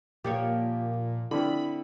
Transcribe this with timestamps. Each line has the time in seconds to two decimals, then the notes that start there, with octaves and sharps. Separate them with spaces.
0.24 A#2 F3 A#3 G4 C#5
1.31 D3 C4 D4 E4 B5